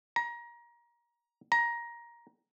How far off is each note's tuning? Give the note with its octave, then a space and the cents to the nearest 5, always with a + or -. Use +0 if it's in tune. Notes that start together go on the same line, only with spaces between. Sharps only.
A#5 +25
A#5 +15